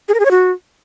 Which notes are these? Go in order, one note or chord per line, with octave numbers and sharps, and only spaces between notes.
G#4
A#4
G#4
C#5
F#4